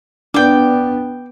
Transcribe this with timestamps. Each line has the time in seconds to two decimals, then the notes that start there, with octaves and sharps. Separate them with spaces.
0.34 B3 D4 G5 D6